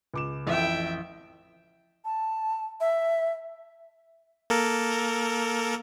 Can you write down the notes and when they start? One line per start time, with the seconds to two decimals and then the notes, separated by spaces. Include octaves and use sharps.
0.14 C#2 D6 E7
0.47 A1 F2 E5 G5
2.05 A5
2.80 E5
4.50 A#3 A4 A#4